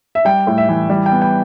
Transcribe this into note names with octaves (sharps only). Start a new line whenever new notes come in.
E5
G3 G5
A2
E5
E3
G3
G5
B3
G5